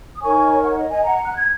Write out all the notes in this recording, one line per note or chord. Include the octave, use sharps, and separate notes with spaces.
D#6
D#4 A#4 C#5 G#5 C#6
C#5 F#5
D#5
D#5 G#5
F#5 A#5
F#6
G#6